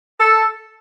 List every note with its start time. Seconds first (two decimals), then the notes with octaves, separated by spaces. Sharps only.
0.20 A4